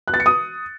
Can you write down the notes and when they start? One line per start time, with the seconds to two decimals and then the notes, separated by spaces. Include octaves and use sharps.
0.08 F#6
0.14 A6
0.20 C#7
0.26 D#6